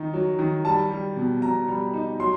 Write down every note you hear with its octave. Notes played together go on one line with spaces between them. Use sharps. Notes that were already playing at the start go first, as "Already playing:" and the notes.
Already playing: D#3 D#4
F#3
D#3
G3 A5
G3
B2
B2 A#5
G3
D#4
F#3 C6